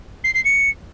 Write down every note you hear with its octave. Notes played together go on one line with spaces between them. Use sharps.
C7
C7
C#7